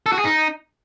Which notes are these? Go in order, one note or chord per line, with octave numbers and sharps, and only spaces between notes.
A4
F#4
G#4
D#4